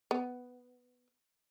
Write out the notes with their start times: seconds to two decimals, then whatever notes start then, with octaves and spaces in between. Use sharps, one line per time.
0.11 B3